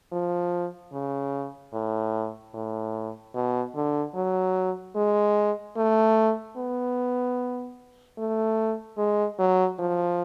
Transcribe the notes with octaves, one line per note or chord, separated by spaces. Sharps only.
F3
C#3
A2
A2
B2
D3
F#3
G#3
A3
B3
A3
G#3
F#3
F3